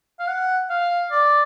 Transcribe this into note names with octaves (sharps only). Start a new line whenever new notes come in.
F5
F#5
F5
D5